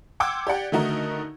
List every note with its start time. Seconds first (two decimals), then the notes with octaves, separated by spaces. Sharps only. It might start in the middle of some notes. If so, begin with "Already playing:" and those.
0.20 F#5 G5 C6 D6 E6 G#6
0.47 G4 D5 F#5 G5
0.72 D3 D#3 A3 D#4 F#4 A#4